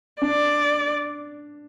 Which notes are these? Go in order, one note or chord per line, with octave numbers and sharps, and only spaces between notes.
D4 D5